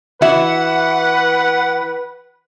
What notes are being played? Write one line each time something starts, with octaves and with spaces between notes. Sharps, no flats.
E3 F#4 B4 E5 F#5